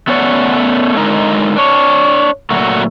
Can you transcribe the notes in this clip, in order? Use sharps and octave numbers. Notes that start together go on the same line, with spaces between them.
A3 B3 C#4 C#5 D5 F#5
D3 G#3 D#4 A#4
D4 C#5
A#2 F#3 A3 F#4